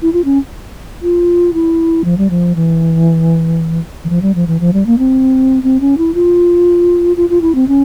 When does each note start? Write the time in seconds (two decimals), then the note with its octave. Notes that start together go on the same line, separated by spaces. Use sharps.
0.02 E4
0.13 F4
0.25 C#4
1.02 F4
1.53 E4
2.04 F3
2.18 G3
2.30 F3
2.56 E3
4.04 E3
4.10 F3
4.22 G3
4.35 F3
4.47 E3
4.60 F3
4.73 G3
4.86 A#3
4.98 C4
5.63 C4
5.80 C#4
5.98 E4
6.14 F4
7.17 F4
7.29 F4
7.42 E4
7.55 C4
7.68 C#4